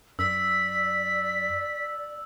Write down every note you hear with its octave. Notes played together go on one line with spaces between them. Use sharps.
F#2 D5 E6 B6